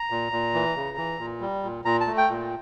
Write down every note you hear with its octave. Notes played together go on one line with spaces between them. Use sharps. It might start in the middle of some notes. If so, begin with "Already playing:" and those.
Already playing: A#5
A#2
A#2
E3
C#3
E3
A#2
G3
A#2
A#2 A#5
A5
A3
G5
A#2